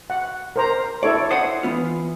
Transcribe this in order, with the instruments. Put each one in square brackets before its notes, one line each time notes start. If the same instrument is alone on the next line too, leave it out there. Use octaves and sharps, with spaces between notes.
[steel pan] F#5
A#4 C5 A#5
[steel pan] E4 A4 C#5 [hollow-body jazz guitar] D5
[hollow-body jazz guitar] C5 D5 F#5 [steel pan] D#6
[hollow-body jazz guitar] E3 B3 F4